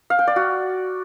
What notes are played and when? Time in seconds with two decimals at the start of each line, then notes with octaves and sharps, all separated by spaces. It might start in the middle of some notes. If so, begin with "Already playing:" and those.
0.10 F5
0.19 G5
0.27 D5
0.36 F#4